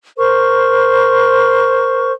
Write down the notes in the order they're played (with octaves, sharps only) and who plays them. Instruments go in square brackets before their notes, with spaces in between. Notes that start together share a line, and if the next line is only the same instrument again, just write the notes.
[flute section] A#4 C5 C#6